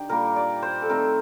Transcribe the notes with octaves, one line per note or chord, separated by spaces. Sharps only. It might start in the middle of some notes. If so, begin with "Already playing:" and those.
Already playing: D#3 D4 G4
A#2 G3 A#3 A#4
D5
C5
A4
D#3 A3 C4 A#4